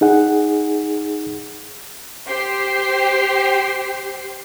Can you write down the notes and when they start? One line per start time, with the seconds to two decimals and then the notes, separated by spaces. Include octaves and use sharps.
0.01 D#4 G#4 F#5
2.27 G4 C5 G5 C7